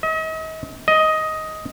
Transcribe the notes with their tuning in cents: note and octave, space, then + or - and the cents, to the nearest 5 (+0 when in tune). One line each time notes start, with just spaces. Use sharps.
D#5 +40
D#5 +10